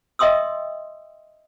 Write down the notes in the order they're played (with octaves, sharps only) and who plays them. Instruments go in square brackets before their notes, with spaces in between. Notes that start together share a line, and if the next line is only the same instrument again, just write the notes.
[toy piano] D#5 E5 G5 C6 D#6 E6